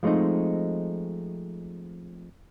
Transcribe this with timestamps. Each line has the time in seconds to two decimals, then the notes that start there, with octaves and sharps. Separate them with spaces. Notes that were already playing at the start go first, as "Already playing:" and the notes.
0.03 F3 G#3 A3 C4 D#4